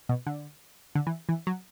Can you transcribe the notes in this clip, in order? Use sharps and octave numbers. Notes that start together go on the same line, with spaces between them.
B2
D3
D3
E3
E3
F#3